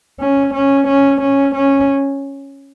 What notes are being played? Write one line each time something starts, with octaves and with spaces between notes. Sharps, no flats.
C#4
C#4
C#4
C#4
C#4